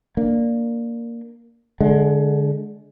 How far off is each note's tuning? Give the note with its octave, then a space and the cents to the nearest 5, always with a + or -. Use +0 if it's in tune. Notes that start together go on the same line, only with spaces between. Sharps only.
A#3 +0 D4 +0
D3 -10 G#3 +15